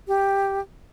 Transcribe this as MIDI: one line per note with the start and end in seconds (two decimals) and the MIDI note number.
0.08 0.60 67